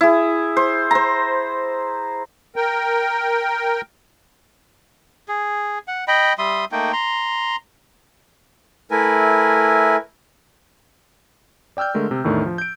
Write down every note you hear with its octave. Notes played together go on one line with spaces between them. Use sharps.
E4 G#4
C5
C5 A#5
A#4 G5
G#4
F#5
D#5 G5 B5
G3 E5 C6 D#6
A3 A#3 D#4 G5
A#5 C6
A3 E4 A#4 B4 G#5
D5 G5 E6 F6 G6
D3 G#3 A3 A#4
C3
E2 A2 D#3 A3 D4
F3
G6 D7